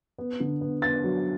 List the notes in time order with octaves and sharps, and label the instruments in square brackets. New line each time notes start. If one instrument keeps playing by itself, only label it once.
[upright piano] B3
D3
B3
B3 A6
F#3